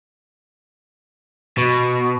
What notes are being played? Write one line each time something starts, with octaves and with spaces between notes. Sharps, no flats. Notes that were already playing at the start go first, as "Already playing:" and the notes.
B2